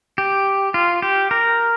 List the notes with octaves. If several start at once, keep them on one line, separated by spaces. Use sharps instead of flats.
G4
F4
G4
A#4